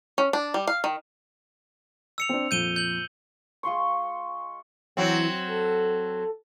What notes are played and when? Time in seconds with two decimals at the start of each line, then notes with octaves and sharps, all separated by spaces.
0.18 C#4
0.33 D4
0.54 G3
0.68 F5
0.84 D#3
2.18 E6 C#7 F7
2.29 C4 D4
2.51 F2 A#2 G6 D#7 G7
2.76 G6 F#7
3.63 G#3 F4 C6 C#6
4.97 E3 F#3 C4
5.48 A4